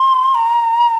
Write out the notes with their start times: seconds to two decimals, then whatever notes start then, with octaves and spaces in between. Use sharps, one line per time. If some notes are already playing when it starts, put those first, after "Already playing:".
Already playing: C6
0.34 A#5